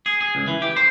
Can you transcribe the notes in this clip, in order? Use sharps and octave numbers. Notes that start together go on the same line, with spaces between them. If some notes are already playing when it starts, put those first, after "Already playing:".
G#4
G#4
C#2
E3
G4
C5